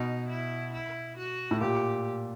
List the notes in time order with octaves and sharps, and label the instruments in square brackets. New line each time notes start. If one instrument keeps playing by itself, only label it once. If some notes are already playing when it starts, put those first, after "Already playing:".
Already playing: [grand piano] B2 [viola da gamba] D#4
[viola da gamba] E4
E4
F#4
[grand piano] A2
[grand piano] A#2 [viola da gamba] G4